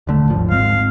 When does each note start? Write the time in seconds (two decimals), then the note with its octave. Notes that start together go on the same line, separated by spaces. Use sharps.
0.07 D#1 D3 A3
0.30 G#1 D#2 F3
0.50 G#2 G#3 C4 F5